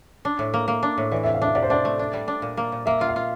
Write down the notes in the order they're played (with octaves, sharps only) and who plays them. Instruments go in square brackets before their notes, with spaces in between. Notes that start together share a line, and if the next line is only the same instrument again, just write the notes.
[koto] D4
A2
A#3
A#3
D4
A2
[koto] E3 [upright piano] D5
[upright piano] E5
[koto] C3
[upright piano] F5
[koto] D4 [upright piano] E5
[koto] C3 [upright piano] D5
[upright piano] C5
[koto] D4 [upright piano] D5
[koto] A3
D4
G3
D4
A#2
A#3
A#2
[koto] A#3 [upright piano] E5
[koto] F4
[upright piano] F5
[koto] F4